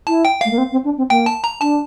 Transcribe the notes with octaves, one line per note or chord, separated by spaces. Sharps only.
E4 A5
G5
A3 F5
A#3
C4
C4
D4
C4
A#3 G5
A5
A#5
D4 A5